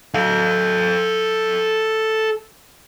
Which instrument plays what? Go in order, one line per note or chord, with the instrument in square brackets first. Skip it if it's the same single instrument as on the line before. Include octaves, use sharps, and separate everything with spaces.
[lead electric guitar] A4 F5